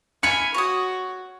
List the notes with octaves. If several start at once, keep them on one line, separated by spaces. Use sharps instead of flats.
E4 F5 G#5 B5 C#7
F#4 C#5 D#6